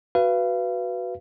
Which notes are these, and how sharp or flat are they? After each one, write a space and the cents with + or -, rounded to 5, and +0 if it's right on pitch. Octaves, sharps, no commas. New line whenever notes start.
F#4 +5 B4 +0 F5 -35